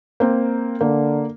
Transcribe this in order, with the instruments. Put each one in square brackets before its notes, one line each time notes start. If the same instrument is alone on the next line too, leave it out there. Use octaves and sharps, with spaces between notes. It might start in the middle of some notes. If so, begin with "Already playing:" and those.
[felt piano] A#3 C4
[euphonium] D3 [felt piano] A#3